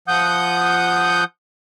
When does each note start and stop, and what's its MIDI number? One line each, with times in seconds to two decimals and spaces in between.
0.08 1.24 53
0.08 1.24 78
0.08 1.24 87
0.08 1.24 91